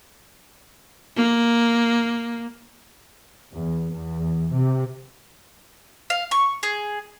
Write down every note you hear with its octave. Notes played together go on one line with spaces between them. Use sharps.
A#3
E2
E2
C3
F5
C#6
G#4